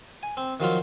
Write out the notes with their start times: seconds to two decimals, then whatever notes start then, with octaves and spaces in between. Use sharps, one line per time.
0.23 G#5
0.37 C4
0.60 D#3 F3 F#3 F4